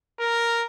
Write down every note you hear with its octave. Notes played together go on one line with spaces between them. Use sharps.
A#4